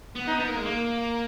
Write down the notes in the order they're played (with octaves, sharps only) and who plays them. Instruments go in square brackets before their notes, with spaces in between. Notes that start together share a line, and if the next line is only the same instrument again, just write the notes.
[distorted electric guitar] B3
[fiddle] D#4
[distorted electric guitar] B3
A#3
G#3
A#3